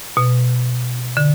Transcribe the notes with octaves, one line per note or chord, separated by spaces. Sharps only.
B2
D3